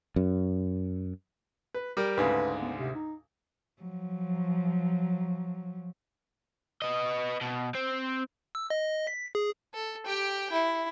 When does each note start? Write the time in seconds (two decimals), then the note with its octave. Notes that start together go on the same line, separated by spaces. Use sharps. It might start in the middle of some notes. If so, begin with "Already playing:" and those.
0.16 F#2
1.74 B4
1.97 G3 G4 A#4
2.17 D2 G#2 C#3 B4
2.62 B3
2.78 C3
2.95 D#4
3.82 F3 F#3
6.82 B3 D#5
7.41 B2
7.75 C4
8.55 E6
8.70 D#5
9.07 B6
9.35 G#4
9.74 A4
10.06 G4 G5
10.52 E4